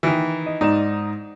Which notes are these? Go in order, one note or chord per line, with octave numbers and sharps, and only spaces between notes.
D#3 E3
D#5
G#2 D#4 D5 E7